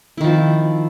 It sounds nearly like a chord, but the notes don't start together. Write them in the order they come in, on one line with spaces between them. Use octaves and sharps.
E4 D#3 F3 C4